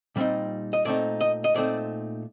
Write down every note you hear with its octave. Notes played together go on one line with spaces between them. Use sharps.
A#2 G3 C4 D#4
D#5
A#2 A3 C4 D#4 D5
D#5
D#5
A#2 A3 C4 D#4 D5